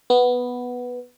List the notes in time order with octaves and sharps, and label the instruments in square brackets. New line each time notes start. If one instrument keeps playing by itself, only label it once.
[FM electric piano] B3